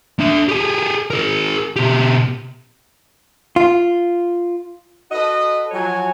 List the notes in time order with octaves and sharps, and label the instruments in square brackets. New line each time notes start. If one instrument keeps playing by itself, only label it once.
[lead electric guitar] D4 E5
G4 G#4
G#4 A#4
B2 G4
[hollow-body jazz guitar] F4
[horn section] F#4 A4 B4 D#5
F3 F#3 F#4 C#5 G#5